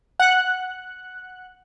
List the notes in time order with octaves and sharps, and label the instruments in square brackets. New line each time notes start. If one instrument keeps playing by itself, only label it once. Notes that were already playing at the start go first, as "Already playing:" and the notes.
[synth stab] F#5 F#6